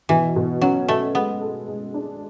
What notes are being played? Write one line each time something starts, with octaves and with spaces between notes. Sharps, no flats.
B2 E3
B2
F#3 C#4
B2 A3
G#3 B3
A4
G#3
D4